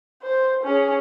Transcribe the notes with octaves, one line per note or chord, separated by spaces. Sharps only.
C5
C#4 G#4